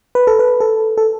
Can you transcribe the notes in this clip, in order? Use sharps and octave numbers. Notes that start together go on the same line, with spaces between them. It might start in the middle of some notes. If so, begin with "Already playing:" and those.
B4
A4
B4
A4
A4